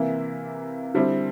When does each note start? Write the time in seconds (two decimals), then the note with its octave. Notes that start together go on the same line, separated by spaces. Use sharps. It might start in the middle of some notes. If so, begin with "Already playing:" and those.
Already playing: C3 E3 A#3 E4
0.94 D3 G3 C4 E4